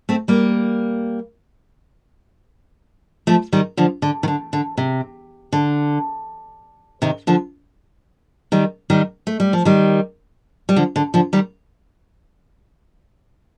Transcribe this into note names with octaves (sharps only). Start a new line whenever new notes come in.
A3 C4
G3 A#3
F3 A3
D#3 G3
D3 F3
D3
D#3
D3
D3
C3
D3
C3 D#3
D3 F3
D#3 G3
D#3 G3
A3
G3
F3
D#3 G3
G3
D3 F3
D3
D3 F3
D#3 G3